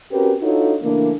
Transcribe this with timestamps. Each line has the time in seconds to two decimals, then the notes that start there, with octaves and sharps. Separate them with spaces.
0.11 C4 C#4 F#4 G4 A#4 B4
0.42 D4 D#4 F4 F#4 A4 C#5
0.82 C#3 E3 A3 A#3 D4